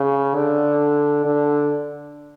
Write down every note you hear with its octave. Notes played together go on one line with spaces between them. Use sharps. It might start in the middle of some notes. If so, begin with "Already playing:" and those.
Already playing: C#3
D3
D3